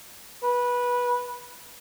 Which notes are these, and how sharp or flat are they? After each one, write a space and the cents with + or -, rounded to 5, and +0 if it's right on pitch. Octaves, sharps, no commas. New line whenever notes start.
B4 -20